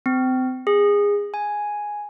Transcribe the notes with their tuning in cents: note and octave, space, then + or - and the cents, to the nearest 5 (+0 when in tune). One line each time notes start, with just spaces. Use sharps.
C4 -30
G#4 -25
G#5 +0